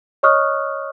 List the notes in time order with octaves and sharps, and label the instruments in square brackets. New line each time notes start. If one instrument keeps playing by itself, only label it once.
[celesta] C#5 D#5 C#6 D#6 F6 F#6